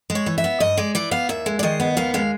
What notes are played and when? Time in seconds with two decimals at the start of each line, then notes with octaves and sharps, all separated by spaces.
0.10 G#3
0.15 C#5
0.26 E3
0.38 E5
0.44 B3
0.60 G2 D#5
0.77 G#3 D5
0.95 E3 D5
1.11 B3 F5
1.29 D#2 E5
1.46 G#3
1.59 D5
1.63 D#3 D#5
1.80 B3
1.97 D#2 F5
2.14 G#3 F5